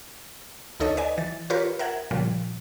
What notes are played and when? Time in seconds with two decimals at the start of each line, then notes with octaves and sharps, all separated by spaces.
0.80 D2 D#4 A4 C#5 D#5
0.97 B4 D5 D#5 G#5
1.18 E3 A6
1.50 F4 G4 A#4 B4 C#5
1.79 A#4 E5 F#5 G#6
2.11 A#2 C#3 F3 G3